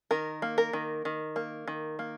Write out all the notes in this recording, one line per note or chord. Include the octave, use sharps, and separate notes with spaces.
D#3 A#4
A#3
A#4
D#3
D#3
A#3
D#3
A#3